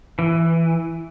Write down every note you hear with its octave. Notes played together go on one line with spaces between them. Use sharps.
E3